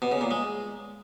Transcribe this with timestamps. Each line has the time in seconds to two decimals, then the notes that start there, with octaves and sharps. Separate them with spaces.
0.02 B2
0.12 C#3
0.21 A#2
0.31 G#3